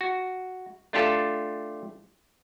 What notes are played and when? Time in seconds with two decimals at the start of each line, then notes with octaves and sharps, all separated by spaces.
0.01 F#4
0.93 A3 D4 F4 G4 A4